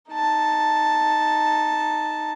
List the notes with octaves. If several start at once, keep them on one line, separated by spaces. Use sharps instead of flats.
D#4 A5